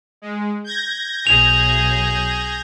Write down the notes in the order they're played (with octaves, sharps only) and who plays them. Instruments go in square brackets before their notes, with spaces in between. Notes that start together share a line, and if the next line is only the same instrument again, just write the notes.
[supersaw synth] G#3
G6 G#6 A#6
[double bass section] B1 [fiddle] G#4 [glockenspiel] F7